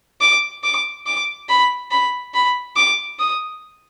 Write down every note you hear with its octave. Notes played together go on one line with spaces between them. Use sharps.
D6
D6
D6
B5
B5
B5
D6
D#6